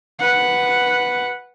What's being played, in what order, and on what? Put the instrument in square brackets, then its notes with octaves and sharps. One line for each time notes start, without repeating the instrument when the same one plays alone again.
[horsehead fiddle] B4 F#5